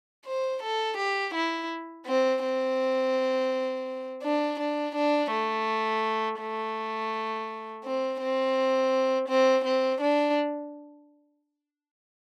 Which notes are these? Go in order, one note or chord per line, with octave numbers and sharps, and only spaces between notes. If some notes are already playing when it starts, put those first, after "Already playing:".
C5
A4
G4
E4
C4
C4
D4
D4
D4
A3
A3
C4
C4
C4
C4
D4